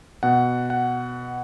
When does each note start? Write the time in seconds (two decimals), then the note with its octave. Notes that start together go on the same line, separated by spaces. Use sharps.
0.23 B2 F#5
0.70 F#5